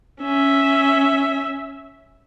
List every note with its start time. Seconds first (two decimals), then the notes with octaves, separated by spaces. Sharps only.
0.21 C#4 E5